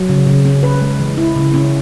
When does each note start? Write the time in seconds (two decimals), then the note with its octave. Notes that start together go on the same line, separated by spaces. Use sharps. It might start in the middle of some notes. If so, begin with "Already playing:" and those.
Already playing: F#3
0.09 C#3
0.27 C#3
0.45 C#4
0.63 B4
0.81 G#3
1.00 E3
1.17 E4
1.36 C#3
1.54 C#4